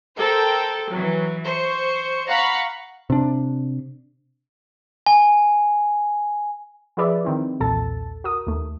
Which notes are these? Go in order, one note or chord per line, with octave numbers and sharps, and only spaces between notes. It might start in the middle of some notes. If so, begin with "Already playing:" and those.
A4 A#4 C5 G5
E3 F#3
C5 C#6
F5 F#5 A#5 B5 C#6
C3 D4
G#5
F3 F4 G#4 B4 D5 E5
D#3 C4 E4
B1 E2 A#2 A4 A5 A6
F#4 A#4 D#6
D#2 A3